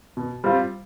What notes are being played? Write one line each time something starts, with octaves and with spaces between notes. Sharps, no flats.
B2
G3 C4 F4